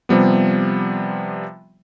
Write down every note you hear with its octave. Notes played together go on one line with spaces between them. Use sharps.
C3 F3 G3 B3